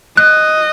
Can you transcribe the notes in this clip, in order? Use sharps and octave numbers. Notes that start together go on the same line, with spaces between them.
D#5 F#6